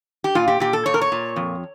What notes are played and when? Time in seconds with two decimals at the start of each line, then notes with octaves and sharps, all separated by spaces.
0.24 G4
0.35 A#2 F4
0.48 G4
0.60 A#2 G4
0.73 A4
0.86 A#2 C#5
0.94 A#4
1.01 C#5
1.12 A#2
1.36 F2